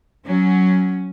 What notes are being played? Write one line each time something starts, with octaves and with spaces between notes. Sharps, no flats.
F#3 C#4